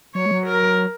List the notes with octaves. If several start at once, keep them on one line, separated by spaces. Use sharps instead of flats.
F#3 C#5
G#3
F#3
A#4